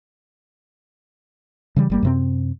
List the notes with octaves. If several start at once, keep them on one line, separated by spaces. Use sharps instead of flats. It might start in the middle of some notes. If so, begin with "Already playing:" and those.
C#3 E3 G3
G1 G3 A#3
F#2 C3 C4